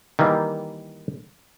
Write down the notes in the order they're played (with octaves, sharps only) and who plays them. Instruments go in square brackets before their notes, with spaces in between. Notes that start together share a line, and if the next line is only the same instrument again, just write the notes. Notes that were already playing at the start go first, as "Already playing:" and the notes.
[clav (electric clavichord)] D#3 E3 G3 A#3